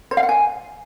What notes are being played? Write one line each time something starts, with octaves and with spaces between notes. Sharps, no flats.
C5
F5
F#5
G#5